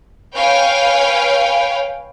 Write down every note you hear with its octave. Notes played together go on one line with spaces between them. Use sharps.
B4 C#5 F5 G5 G#5